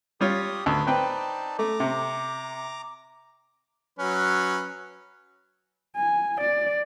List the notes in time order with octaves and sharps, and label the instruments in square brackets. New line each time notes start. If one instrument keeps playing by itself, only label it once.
[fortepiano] G3 F4 C#5 [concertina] G4 D#6
[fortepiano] D2 [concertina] B4
[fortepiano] C4 B4 G5 [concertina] D#4 D5 A5
[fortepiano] A3 [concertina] A#5 D6
[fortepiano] C3
[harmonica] F#3 C#4 B4
[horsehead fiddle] G#5
D5